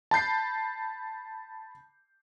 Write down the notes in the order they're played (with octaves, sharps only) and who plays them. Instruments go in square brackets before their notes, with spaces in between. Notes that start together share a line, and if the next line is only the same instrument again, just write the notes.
[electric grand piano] A5 B5 G6 C7